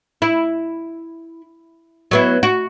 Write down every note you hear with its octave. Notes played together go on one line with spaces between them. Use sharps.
E4
F#3 B3 E4
F#4